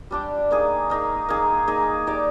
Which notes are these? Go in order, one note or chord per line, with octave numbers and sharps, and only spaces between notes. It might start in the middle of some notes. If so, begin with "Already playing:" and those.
G3 D4 G4
A#3 D#4 G#4
A#3 D#4 G#4
A#3 D#4 G#4
A#3 D#4 G#4
D#4 G4 D5